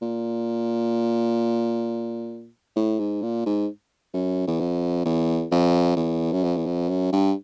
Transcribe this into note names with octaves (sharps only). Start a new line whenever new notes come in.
A#2
A2
G#2
A#2
G#2
F#2
E2
F2
E2
F2
E2
F#2
F2
E2
F2
F#2
G2